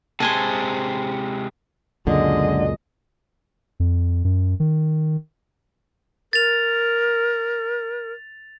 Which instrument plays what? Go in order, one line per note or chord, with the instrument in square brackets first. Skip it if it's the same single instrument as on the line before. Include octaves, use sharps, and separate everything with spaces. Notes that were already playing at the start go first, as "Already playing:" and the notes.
[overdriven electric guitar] C3 G#3 [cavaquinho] C5 G#5 A5
[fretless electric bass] C#2 F#2 A#2 [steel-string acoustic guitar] D3 [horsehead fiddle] G#3 D#5
[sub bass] F2
F#2
D#3
[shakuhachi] A#4 [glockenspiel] A6 F7